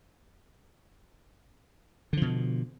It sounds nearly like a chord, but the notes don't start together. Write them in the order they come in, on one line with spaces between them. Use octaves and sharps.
D3 F3 B2